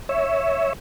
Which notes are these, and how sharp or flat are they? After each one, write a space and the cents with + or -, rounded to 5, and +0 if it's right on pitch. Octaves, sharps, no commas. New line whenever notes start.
C#5 +0 E5 +0